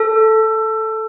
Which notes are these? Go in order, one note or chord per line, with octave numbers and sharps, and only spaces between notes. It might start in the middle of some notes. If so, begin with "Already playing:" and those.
Already playing: A4